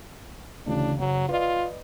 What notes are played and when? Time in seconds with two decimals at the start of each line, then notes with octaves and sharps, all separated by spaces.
0.67 D2 C#3 E3 D4
0.99 F#1 F#3
1.29 F4 B4 D5 D#5